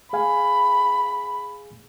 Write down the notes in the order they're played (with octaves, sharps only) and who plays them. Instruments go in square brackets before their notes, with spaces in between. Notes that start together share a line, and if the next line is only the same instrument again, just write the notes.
[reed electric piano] G#4 F5 G#5 [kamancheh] B5